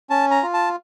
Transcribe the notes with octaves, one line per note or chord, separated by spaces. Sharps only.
C#4 A5
A#5
F4
A5